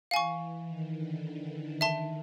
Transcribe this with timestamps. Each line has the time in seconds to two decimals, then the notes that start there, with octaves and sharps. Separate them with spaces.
0.11 E3 F5 G#5 C#6
0.39 E3
0.68 D#3
0.97 D3
1.39 D3
1.81 D#3 E5 A5 C6